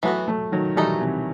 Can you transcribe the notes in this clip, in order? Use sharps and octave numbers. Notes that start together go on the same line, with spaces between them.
E3 F#3 A3 B3 F#4
F#3 A3
D#3 F#3
E3 G3 A3 D#4 A4
C3 E3